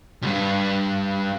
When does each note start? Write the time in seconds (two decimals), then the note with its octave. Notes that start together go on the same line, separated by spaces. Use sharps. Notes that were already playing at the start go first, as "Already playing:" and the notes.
0.22 C2 G2